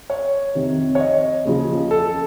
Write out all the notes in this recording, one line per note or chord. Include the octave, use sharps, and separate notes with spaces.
C#5
F2 C3 D#3
C#5
D#5
D#2 C#3 F3
A4
A4